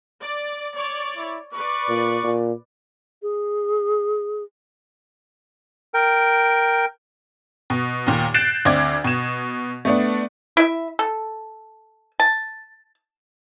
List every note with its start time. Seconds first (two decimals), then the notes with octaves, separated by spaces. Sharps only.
0.21 D5
0.75 C#5 D5
1.16 E4
1.53 B4 D5 C#6
1.89 A#2
2.24 A#2
3.22 G#4
5.94 A#4 G5
7.70 B2
8.07 D#2 A#2
8.34 F#6 G6 A6 C7 D7 E7
8.65 D2 C4 D5 D6 G#6
9.04 B2 E7
9.85 A3 B3 D4
10.57 E4 E5
10.99 A4
12.20 A5